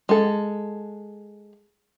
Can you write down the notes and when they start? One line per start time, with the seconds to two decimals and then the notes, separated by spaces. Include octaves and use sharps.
0.09 G#3 A4